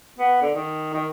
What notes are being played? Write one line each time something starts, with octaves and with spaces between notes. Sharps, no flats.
B3
D3
D#3
D#3